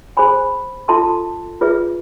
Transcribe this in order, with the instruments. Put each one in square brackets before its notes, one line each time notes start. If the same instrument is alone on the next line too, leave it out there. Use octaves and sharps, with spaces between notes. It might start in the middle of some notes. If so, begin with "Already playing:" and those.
[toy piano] G#4 C5 G#5 B5
F4 A4 E5 A5 C6
F4 G#4 B4 E5